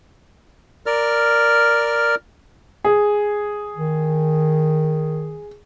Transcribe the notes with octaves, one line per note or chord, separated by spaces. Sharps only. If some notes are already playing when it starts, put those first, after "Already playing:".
A#4 D5 F6
G#4
D#3